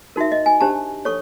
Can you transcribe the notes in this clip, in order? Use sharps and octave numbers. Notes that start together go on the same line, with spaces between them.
D#4 F#4 A#4 E5
D#5
G#5
D4 G4 C5 A5
A4 C#5 C#6